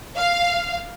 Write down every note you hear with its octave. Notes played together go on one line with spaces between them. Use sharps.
F5